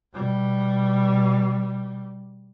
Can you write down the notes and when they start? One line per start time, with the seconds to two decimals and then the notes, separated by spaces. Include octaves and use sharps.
0.14 B2 G3